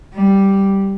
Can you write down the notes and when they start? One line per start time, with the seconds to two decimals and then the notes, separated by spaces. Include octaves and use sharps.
0.14 G3